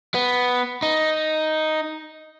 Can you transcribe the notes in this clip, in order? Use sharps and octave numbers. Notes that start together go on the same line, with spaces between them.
B3
D#4